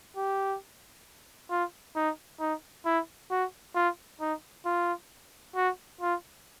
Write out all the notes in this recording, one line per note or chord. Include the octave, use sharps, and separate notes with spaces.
G4
F4
D#4
D#4
E4
F#4
F4
D#4
F4
F#4
F4